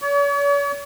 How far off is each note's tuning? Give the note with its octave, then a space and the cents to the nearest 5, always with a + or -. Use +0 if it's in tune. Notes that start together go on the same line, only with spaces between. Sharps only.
C#5 +45